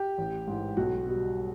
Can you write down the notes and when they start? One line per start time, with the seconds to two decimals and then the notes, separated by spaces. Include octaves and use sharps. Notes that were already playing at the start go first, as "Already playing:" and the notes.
Already playing: G4
0.18 A1
0.47 G#2 E3
0.77 B1 F#4
1.06 B2 G3